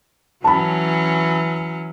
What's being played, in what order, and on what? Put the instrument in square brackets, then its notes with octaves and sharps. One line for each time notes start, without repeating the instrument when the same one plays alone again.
[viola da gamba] E3 F#3 C#4 [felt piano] A5 B5